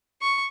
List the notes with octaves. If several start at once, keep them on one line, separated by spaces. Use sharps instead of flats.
C#6